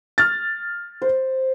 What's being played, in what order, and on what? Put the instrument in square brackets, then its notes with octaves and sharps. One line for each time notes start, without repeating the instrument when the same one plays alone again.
[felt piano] F6 A6
[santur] C5